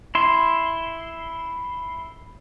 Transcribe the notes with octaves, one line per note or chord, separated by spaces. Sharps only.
E4 C6